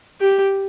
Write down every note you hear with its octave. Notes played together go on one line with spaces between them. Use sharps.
G4